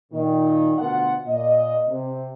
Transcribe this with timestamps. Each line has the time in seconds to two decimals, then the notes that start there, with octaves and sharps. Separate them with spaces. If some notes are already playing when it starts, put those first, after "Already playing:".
0.12 A#2 D#3
0.77 D2 B2 F4 F#5
1.26 A#2 D#5
1.87 C3